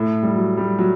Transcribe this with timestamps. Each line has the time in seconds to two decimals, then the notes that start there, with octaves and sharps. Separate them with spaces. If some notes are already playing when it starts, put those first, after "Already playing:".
Already playing: A2
0.23 G3
0.36 F#3
0.57 G3
0.79 F#3